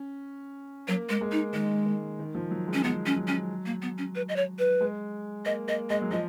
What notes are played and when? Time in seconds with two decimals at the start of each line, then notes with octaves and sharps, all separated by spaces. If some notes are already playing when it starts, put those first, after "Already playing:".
Already playing: C#4
0.88 F#3 A#3
1.09 G#3 A#3
1.21 G#3
1.32 D#4
1.53 D#3 G#3
1.85 D#3
2.19 D#3
2.35 F3
2.51 F#3
2.68 G#3
2.74 C#4
2.84 G#3 B3
3.06 C#4
3.17 F#3
3.27 C#4
3.66 A#3
3.82 B3
3.98 C#4
4.15 B4
4.29 D#5
4.36 C#5
4.59 B4
4.81 G#3
5.46 A#3 D#5
5.67 A#3 D#5
5.90 G#3 D#5
6.02 F#3
6.11 F3 D#5